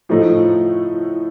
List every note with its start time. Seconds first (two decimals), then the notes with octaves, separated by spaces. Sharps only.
0.09 A2 F3 A3 D#4